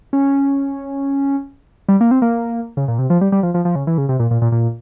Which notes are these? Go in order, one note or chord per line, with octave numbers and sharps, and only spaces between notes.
C#4
G3
A#3
C4
A#3
C#3
A#2
C3
F3
G3
G3
F3
F3
F3
C#3
E3
C#3
C3
A#2
A#2
A#2
A#2